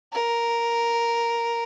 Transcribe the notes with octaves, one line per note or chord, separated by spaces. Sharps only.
A#4